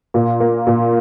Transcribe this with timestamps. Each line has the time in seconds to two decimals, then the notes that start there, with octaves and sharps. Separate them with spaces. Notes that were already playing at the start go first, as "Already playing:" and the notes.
0.14 A#2
0.40 A#3
0.67 A#2